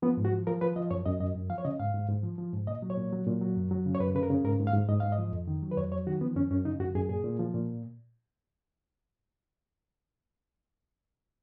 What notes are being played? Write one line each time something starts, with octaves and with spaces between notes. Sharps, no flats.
F3 B3
G#2
F#4
F3
F3 A#4
F3 B4
F3 D#5
F#2 C#5
F#2 D#5
F#2 D#5
F#2
F3 F5
C#5
C#3 D#5
G#2 F5
G#2
G#2
F3
F3
G#2
A#2 D#5
F#3
C#5
A#2
F#3
A#2
F#3
F#2
F#3
C#3
C#5
F#2 B4
C#3 B4
A#4
C#3
G#2 A#4
G#2
F5
G#2
G#2 D#5
G#2 F5
D#5
F3
F2
D#3
F#3
B4
F2 C#5
F#3 C#5
D#3 F#4
F3 B3
F#2 C#4
F#2 C#4
C#3 D#4
F#2 F#4
F#2 G#4
A#2 G#4
A#2
F3
A#2